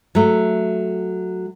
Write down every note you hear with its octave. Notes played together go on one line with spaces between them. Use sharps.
F#3 A3